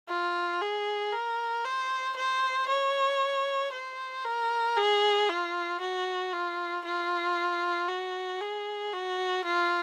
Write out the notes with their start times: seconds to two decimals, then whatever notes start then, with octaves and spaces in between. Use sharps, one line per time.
0.09 F4
0.61 G#4
1.13 A#4
1.65 C5
2.16 C5
2.68 C#5
3.73 C5
4.25 A#4
4.77 G#4
5.29 F4
5.81 F#4
6.33 F4
6.85 F4
7.89 F#4
8.41 G#4
8.93 F#4
9.45 F4